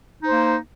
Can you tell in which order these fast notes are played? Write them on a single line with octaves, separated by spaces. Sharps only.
D#4 C5 A#3